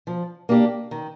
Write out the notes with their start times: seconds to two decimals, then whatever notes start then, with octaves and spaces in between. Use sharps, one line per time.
0.07 F3
0.49 A#3 D4 G4
0.91 D#3